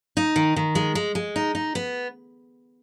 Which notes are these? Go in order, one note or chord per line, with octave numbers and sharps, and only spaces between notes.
D#4
D#3
D#3
G#3
G#3
G#3
D#4
D#4
B3